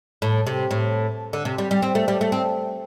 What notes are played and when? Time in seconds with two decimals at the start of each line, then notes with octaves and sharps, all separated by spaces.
0.22 A2
0.47 C3
0.71 A2
1.33 D3
1.45 C3
1.58 G3
1.71 G3
1.82 C4
1.95 A3
2.08 G3
2.21 A3
2.32 C4